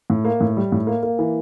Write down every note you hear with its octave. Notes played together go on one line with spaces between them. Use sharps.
A2
A#3
A2
G3
A2
A#3
A#3
E3